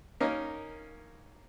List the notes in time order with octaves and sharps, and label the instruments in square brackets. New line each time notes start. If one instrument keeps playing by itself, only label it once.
[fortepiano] A#3 C#4 D#4 A#4